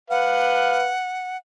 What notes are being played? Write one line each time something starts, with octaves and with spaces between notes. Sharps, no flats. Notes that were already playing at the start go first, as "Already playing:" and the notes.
B4 F5 F#5